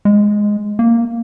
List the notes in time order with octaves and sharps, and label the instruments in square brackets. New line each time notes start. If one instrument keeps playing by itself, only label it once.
[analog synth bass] G#3
A#3